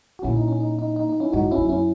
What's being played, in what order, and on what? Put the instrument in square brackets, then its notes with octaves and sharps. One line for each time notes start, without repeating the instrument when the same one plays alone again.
[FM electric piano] F#4
[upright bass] A#2 [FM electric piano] C#4 E4
[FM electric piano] D#4
C#4
D#4
D#4
D#4
D#4
C#4 E4
[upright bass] G#2 [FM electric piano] D#4 F#4
[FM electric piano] C#4 E4
[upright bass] F#2
[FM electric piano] C#4 E4